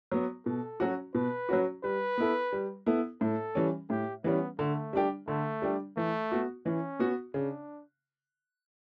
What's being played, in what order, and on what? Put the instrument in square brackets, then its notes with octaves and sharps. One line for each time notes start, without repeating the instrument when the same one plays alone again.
[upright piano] F#3 B3
[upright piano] B2 [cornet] A4
[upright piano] F#3 C#4 F#4
[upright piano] B2 [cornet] B4
[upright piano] F#3 C#4 F#4
[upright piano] G3 [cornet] B4
[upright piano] B3 E4 A4
G3
B3 E4 A4
[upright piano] A2 [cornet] A4
[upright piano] E3 G3 C#4
[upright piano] A2 [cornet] G4
[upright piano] E3 G3 C#4 [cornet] B3
[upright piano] D3 [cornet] A3
[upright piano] G3 D4 G4
[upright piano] D3 [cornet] A3
[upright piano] G3 D4 G4
[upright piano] E3 [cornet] A3
[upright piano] B3 F#4
[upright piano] E3 [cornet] C#4
[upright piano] B3 F#4
[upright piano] C#3 [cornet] D4